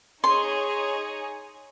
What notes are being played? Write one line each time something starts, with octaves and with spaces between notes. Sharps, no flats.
D#4 G#4 C#5 C6